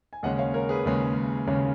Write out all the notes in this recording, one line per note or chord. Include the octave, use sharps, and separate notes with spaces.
G#5
D#2 C#3 G#3 C#4 D#5 F#5
C#5 F5
A#4 C#5
G#4 B4
D#2 C#3 G#3 C#4
D#2 C#3 G#3 C#4